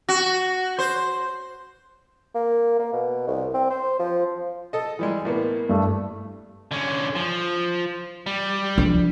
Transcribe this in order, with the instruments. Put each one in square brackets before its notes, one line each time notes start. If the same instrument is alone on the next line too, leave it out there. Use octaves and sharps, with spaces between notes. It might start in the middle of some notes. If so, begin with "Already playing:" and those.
[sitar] F#4
C5
[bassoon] A#3
A#3
B2
C2
C4
C5
F3
[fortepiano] A4 D#5
E3 G3 G#3
A2 A#3 B3
[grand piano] G2 A3
[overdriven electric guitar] D3 C#4
F3
G3
[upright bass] F3 D4